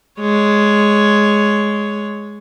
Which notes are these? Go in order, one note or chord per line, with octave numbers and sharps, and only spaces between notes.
G#3 C#5